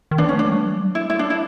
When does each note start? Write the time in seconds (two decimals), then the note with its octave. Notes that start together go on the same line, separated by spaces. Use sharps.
0.11 D#3
0.18 E3 D4
0.29 C#4
0.34 A3
0.39 D4
0.49 G3
0.64 F#3
0.79 G3
0.95 E4
1.10 E4
1.19 D4
1.30 E4